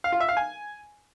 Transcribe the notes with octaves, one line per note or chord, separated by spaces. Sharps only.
F5
F4
E5
F5
G#5